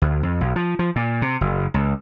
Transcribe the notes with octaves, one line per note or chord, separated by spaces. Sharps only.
D2
F2
B1
F3
F3
A#2
C3
F#1
C#2